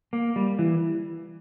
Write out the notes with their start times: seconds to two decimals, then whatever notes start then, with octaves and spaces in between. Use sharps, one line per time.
0.13 A#3
0.36 G3
0.59 E3